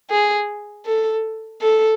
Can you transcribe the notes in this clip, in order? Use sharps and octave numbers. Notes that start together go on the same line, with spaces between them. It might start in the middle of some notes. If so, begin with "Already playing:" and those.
G#4
A4
A4